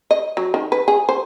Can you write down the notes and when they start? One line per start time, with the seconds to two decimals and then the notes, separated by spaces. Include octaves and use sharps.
0.11 D#5
0.37 F#3
0.54 D#3
0.72 B4
0.88 G#4
1.09 C5